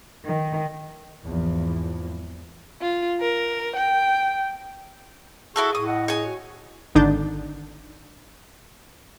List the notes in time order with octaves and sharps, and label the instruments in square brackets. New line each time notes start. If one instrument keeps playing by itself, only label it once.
[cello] D#3
[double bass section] G#1 E2 E3 F3
[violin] F4
A#4
G5
[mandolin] E4 F#4 A4 [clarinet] G#4 [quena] C#6
[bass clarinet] A2 [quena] C#6 [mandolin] D#6
[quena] D#5 [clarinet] F#5
[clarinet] G#4 [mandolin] C#5 G#5
[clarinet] F#4
[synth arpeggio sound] G#1 D3 D4 D#4 G6 A6